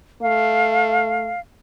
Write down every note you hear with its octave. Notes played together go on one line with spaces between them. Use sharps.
A3 F5